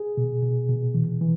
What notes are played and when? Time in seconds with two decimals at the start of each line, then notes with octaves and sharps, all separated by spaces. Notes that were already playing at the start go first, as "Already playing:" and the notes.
Already playing: G#4
0.17 B2
0.43 B2
0.69 B2
0.94 E3
1.21 E3